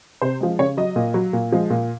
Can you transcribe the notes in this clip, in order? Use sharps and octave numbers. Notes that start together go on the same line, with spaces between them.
C3 C5
F3 G#3
C#3 C#5
F#3 D#5
A#2
F#3
A#2
F3 G#3
A#2